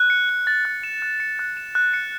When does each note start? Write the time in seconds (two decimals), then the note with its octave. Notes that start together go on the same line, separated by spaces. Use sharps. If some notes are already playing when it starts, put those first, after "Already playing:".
Already playing: F#6
0.10 C#7
0.29 F#6
0.47 A6
0.65 F#6
0.83 E7
1.02 F#6
1.20 C#7
1.39 F#6
1.57 E7
1.75 F#6
1.94 C#7